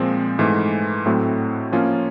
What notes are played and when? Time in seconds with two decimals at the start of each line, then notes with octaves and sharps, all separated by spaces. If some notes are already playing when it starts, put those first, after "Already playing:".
Already playing: A#2 F3 G#3 C4
0.39 G#2 E3 A3
1.06 A2 F#3 A3 C4 E4
1.72 F3 A#3 C#4 F4